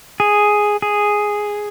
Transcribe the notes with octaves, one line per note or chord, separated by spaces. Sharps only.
G#4
G#4